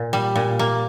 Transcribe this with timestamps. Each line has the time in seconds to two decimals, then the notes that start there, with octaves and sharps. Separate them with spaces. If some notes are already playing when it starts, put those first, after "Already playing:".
Already playing: A#2
0.13 G3
0.36 A#2
0.59 A#3